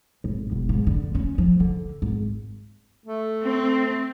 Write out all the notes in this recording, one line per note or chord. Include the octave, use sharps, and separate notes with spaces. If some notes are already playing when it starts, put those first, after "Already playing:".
G#1
E1
G#2
D3
C#4
F3
D3
G#1
A3
C4